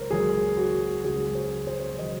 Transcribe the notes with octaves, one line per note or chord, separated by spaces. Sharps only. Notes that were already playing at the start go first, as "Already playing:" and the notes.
Already playing: C#2 C#3 F#3 A#4 C5 C#5
C#2 C#3 F#3 G#4
F#4
C#2 C#3 F#3 G#4
C5
C5
C5
C#5
C#3 F#3 D#5